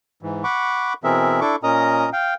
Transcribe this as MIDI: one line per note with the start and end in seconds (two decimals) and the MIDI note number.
0.23 0.43 44
0.23 0.43 52
0.44 0.93 78
0.44 0.93 83
0.44 0.93 85
0.44 0.93 86
1.04 1.40 47
1.04 1.40 52
1.04 1.40 60
1.04 1.40 68
1.04 1.40 70
1.04 1.40 76
1.41 1.56 62
1.41 1.56 64
1.41 1.56 69
1.41 1.56 85
1.41 1.56 86
1.63 2.09 46
1.63 2.09 61
1.63 2.09 70
1.63 2.09 75
1.63 2.09 82
1.63 2.09 87
2.13 2.34 77
2.13 2.34 79